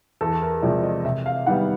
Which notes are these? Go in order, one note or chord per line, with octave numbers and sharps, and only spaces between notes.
E2 A4
A#4
C3 F3 G#3 D5
D#5
C3 E5
F5
D#3 G3 B3 F#5